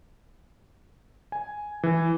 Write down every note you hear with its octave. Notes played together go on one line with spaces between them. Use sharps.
G#5
E3